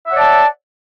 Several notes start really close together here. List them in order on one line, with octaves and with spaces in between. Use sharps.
E5 F#5 C#5 D5 A5